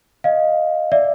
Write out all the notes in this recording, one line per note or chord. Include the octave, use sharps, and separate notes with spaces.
D#5 F5
D5 E5